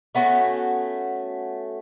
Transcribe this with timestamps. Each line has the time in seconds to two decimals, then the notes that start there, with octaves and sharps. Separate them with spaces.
0.15 A3 B3 C#4 F#4